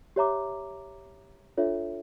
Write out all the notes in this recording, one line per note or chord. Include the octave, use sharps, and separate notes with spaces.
G4 C#5 E5 A#5 D6
D4 F4 A4 C#5 E5